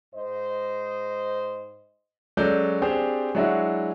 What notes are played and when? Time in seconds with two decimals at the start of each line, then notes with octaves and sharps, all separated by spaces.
0.14 G#2 C5 D#5
2.37 F#3 G#3 C#4 A4 D5 G6
2.82 C4 D4 G4 G#4 C5 D5
3.35 F#3 G#3 D4 E4 F#4